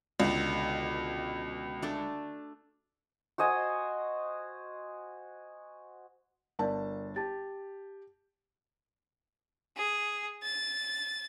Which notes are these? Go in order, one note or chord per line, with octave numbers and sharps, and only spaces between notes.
C#2 B2 D3
A3 D4
F#4 C5 D#5 G#5
G1 A#4 D5 F5 A5
G4 A5 A6
G#4
A6